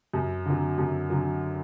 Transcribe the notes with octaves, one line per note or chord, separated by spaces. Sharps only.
F#2
D3 F#3
F#2
D3 F#3